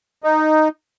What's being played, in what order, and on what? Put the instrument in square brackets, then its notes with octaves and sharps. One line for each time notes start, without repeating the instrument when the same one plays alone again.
[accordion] D#4